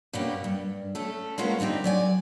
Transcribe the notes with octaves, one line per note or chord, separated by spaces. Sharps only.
G2 B2 G3 A#3 C#4 G4
G2
A3 C#4 A4
G#3 A#3 B3 C#4 F4 A#4
A2 D3 C4 D#4 G4
F#3 D5 G#5